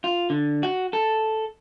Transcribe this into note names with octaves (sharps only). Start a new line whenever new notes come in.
F4
D3
F#4
A4